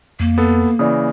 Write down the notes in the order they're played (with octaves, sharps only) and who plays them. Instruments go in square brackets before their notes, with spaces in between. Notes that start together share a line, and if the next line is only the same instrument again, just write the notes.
[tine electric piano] F2 [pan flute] A#3
[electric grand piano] B3 A4
[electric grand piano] C#3 E3 [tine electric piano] D5 D#6